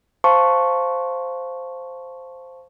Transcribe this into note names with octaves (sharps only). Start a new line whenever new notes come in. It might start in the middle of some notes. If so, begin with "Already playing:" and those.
C5 F5 A5 C6 C#6